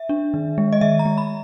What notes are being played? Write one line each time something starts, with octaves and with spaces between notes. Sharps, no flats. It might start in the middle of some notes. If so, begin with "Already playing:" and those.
Already playing: E5
D4
D#3
G#3
D#5
D#3 E5
A#5
G#3
B5